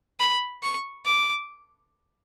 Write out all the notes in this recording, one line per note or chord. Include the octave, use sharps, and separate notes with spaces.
B5
C#6
D6